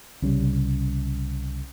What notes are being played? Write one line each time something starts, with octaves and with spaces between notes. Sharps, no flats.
C2 C#3 G3